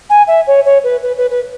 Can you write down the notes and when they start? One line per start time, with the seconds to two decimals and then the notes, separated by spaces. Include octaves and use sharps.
0.10 G#5
0.28 E5
0.47 C#5
0.65 C#5
0.84 B4
1.03 B4
1.17 B4
1.31 B4